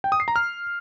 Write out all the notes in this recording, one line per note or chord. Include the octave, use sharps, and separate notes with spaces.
G5
D#6
C7
A#5
F6